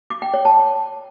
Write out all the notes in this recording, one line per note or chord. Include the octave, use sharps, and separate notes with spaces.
D6
G5
C#5
A5